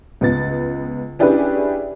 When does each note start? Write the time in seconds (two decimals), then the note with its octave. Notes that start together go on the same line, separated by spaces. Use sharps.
0.21 C#2 B3 A6
1.19 C#4 D4 E4 G4 G#4 B4